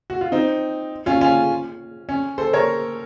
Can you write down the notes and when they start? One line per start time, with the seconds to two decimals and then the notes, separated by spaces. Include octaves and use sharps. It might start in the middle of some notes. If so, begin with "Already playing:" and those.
0.10 F#4
0.21 F4
0.32 C4 D#4
1.06 C#4 F4
1.21 C#4 F4
2.09 C#4
2.38 A4 C5
2.53 A#4 C#5